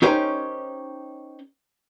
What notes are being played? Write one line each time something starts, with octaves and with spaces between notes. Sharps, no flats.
C#4 D#4 G4 A#4 C5 C#5